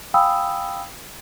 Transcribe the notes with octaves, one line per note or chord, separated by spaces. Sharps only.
F5 G5 G#5 B5 D#6 E6